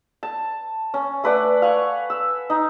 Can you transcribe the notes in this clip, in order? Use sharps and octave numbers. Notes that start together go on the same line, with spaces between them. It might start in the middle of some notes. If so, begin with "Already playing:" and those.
A5
C#4
A3 B4 D5 F#5
F5 F#5 G#5 C#6
E6
D#4